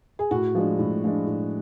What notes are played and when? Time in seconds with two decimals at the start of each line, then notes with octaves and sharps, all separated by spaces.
0.19 G#4
0.31 A2 F#4
0.55 F3 G#3 D4
0.79 A2
1.04 F3 G#3 D4
1.27 A2